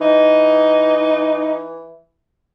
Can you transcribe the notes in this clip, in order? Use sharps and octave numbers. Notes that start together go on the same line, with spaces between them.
E3 D#4